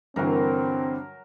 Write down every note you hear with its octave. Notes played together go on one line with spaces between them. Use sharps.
G2 D3 E3 F#3 C4 A#4